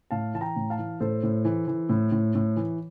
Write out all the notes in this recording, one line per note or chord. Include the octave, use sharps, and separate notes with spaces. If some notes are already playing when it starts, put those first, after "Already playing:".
A2 F5 A5
E3 A5
G5 A#5
A2
F5 A5
E3
A2 A4 C5
A2
E3
E3
A2
A2
A2
E3